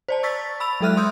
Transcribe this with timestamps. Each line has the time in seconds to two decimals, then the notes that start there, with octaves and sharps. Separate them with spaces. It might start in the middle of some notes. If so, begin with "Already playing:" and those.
0.08 C5 D5 A5
0.23 C#6 E6 A6 B6
0.60 B5 E6 F7
0.81 F#3 G#3 A4 E5 F6 F#6
0.97 C6 D#6 E6 G6